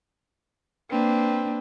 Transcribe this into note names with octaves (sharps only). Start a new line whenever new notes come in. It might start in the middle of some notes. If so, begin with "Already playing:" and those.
A#3 C4 D4 B4